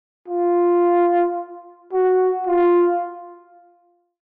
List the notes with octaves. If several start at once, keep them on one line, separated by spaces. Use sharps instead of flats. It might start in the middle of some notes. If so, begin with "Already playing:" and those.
F4
F#4
F4